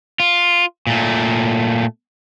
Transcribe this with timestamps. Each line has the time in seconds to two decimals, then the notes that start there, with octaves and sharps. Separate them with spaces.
0.20 F4
0.87 A#2 A3